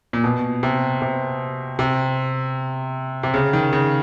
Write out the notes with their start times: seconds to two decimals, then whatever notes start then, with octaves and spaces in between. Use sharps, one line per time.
0.13 A#2
0.24 B2
0.63 C3
1.02 C3
1.79 C3
3.23 C3
3.34 C#3
3.53 D#3
3.73 C#3